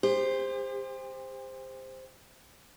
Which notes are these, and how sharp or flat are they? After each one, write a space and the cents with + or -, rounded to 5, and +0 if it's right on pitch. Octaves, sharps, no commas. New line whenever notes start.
G4 +40 C5 +0